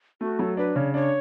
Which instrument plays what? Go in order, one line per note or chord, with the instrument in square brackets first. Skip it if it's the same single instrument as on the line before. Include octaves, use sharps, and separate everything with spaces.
[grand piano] A3 [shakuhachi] F#4
[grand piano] F#3 [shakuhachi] A4
[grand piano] D4 [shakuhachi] B4
[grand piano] C#3 [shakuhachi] C#5
[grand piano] D4 [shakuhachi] C#5